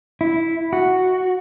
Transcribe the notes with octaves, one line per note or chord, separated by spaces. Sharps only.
E4
F#4